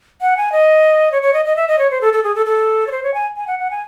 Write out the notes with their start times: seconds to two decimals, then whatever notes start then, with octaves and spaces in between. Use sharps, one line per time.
0.21 F#5
0.37 G#5
0.52 D#5
1.12 C#5
1.22 C#5
1.33 D#5
1.45 D#5
1.56 E5
1.68 D#5
1.79 C#5
1.91 C5
2.01 A4
2.13 A4
2.23 G#4
2.35 A4
2.46 A4
2.87 C#5
2.91 C5
3.03 C#5
3.14 G#5
3.36 G#5
3.47 F#5
3.59 F#5
3.71 G#5